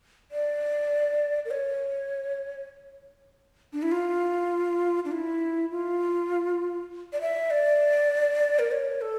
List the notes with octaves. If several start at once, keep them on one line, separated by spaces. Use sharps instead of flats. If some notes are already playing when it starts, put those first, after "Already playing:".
D5
A#4
C#5
D4
E4
F4
D4
E4
F4
D5
E5
D5
A#4
C#5
A4